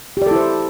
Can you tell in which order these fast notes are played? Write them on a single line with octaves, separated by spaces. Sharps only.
G4 D5 A4 E4 C5